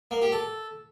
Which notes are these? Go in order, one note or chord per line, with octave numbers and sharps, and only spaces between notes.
A#3
G4
A4